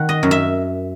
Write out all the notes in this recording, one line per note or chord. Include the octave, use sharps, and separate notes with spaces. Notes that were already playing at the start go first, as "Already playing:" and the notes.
Already playing: D#3 F#5
D#5
F#2
E5